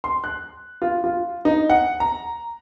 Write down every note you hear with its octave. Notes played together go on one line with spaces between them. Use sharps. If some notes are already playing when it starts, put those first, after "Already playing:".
C6
F#6
F4
F4
D#4
F#5
A#5